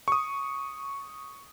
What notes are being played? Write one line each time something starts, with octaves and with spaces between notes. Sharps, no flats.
C#6 D#6